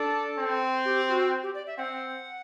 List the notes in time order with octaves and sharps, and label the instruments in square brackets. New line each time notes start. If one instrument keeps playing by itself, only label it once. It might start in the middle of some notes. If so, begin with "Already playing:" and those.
Already playing: [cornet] D4 [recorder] A4
[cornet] C4
[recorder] G4
F#4
G4
D5
E5
[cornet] C4 [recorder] F#5